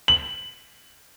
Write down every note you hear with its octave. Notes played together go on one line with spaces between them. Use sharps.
F#7